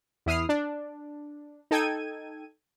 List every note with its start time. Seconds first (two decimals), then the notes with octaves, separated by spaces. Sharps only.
0.26 E2 E4 D#6 F6 C7
0.49 D4
1.71 D#4 A4 G5 G#6 D#7